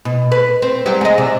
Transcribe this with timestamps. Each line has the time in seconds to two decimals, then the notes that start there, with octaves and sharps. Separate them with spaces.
0.05 B2
0.32 B4
0.62 C4
0.86 F#3 G3 G4
1.01 G#3 D#5
1.18 C3 D4